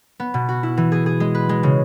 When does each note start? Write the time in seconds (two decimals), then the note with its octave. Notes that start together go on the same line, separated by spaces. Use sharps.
0.20 B3
0.34 B2
0.49 F#4
0.63 E4
0.77 E3
0.92 G#4
1.06 G#4
1.20 G#3
1.35 B4
1.49 G#3
1.63 C#3